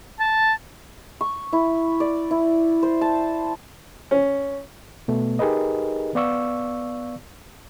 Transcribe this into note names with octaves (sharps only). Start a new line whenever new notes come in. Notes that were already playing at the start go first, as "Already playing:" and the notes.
A5
C#6
E4
D5
E4
C5
A5
C#4
B2 A3 B3
D#4 G4 G#4 A#4 B4 D#5
B3 D5 F5 C#6 E6